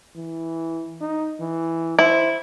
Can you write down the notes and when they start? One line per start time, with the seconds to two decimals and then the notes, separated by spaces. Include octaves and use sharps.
0.16 E3
1.01 D#4
1.40 E3
1.99 E4 C5